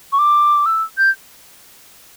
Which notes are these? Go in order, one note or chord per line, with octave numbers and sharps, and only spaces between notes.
C#6
D6
E6
G6